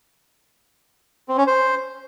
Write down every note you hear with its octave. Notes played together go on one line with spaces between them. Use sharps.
C4
C#4
C5